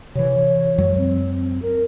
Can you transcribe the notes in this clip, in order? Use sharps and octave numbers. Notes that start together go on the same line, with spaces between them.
C3 E3 C#5
F#2 F#3 G#3
C4
A#4